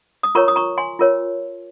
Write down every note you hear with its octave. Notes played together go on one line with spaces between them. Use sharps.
D#6
F4 A#4 C#5 A#5 C#6
D#6
A#5 C#6
G#5 C6
F4 A#4 C#5